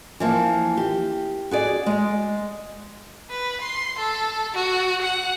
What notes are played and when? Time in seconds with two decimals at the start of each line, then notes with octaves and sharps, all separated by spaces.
0.20 E3 F3 A#3
0.77 G4
1.51 F#4 G#4 D5
1.86 G#3
3.30 B4
3.61 C6
3.98 A4
4.54 F#4
5.02 F#5